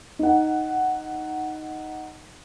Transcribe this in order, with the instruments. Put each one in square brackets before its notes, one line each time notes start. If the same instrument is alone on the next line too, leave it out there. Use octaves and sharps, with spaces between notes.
[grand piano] D#4 F#5